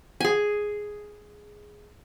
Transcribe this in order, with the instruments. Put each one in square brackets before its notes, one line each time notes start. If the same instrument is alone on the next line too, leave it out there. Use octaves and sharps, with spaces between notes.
[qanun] G#4 G#5